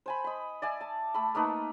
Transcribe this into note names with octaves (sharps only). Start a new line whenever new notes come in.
C5 G#5 B5
D#5 B5
D5 E5 G#5
A5
A3 B5
A3 A#3 D#4 B4